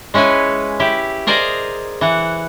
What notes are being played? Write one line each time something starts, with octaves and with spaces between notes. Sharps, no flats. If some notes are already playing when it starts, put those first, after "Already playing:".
G#3 C#4 E4 B4 G#5
E4 G4
G#4 A#4 C5 D5 D#5
E3 F#5